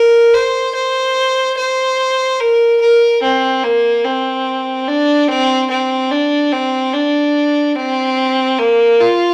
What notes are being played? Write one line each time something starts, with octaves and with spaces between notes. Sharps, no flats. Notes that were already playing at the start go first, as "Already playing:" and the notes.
Already playing: A#4
C5
C5
C5
A#4
A#4
C4
A#3
C4
D4
C4
C4
D4
C4
D4
C4
A#3
F4